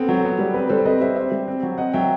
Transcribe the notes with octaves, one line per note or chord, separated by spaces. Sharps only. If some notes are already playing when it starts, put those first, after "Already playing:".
Already playing: B3 C4 A4
F#3
B3
G3
C4 B4
G3 A4 C5
C4 B4 D#5
G3 C5 E5
C4 C5 E5
G3
C4
F#3
C4 D#5 F#5
F#3 E5 G5